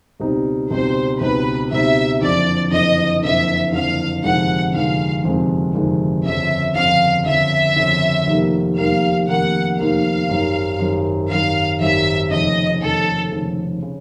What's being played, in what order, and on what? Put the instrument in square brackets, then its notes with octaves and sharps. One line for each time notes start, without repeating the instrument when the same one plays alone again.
[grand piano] C#2 B2 G3 C4 D#4
[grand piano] C#2 B2 G3 C4 D#4 [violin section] C5
[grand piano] C#2 B2 G3 C4 D#4 [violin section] B4
[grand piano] C#2 B2 G3 C4 D#4 [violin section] E5
[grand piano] F#1 F2 D3 [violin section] D5
[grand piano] F#1 F2 D3 [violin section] D#5
[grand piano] F#1 F2 D3 [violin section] E5
[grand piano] F#1 F2 D3 [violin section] F5
[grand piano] G1 F2 C3 D#3 G#3 [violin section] F#5
[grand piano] G1 F2 C3 D#3 G#3 [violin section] F5
[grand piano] G1 F2 C3 D#3 G#3
G1 F2 C3 D#3 G#3
[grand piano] G1 F2 C#3 [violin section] E5
[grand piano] G1 F2 C#3 [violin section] F5
[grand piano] G1 F2 C#3 [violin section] E5
[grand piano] G1 F2 C#3
F1 D#2 D#3 G3 A#3
[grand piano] F1 D#2 D#3 G3 A#3 [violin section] F5
[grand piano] F1 D#2 D#3 G3 A#3 [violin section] F#5
[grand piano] F1 D#2 D#3 G3 A#3 [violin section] F5
[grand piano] G#1 F#2 D#3 G3
G#1 F#2 D#3 G3
[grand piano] G#1 F#2 D#3 G3 [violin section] F5
[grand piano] G#1 F#2 D#3 G3 [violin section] E5
[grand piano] F1 D#2 C#3 [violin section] D#5
[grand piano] F1 D#2 C#3 [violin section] A4
[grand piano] F1 D#2 C#3
C#3